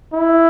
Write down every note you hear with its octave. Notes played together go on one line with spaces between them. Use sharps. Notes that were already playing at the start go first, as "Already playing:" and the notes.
E4